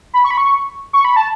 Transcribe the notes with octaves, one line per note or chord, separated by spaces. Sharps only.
B5
C#6
B5
C#6
C#6
B5
A5